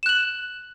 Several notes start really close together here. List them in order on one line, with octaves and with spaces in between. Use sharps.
E7 F#6 F#7